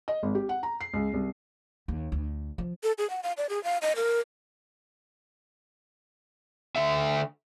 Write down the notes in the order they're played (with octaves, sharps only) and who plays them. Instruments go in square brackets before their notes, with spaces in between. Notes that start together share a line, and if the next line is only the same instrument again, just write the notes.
[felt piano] D#5
G#1
G4
F#5
A#5
C7
C#2
C2
[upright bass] D#2
D2
F3
[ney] A4
G#4
F#5
F5
D5
G#4
F5
D#5
A#4
[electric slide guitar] D3 A4 E5